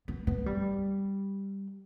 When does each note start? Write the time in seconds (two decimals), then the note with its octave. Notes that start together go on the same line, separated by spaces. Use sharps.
0.08 B3
0.27 B3
0.46 G3